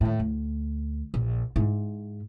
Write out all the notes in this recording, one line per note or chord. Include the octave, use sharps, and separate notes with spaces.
D#2 A2
D2
A#1
G#2 E4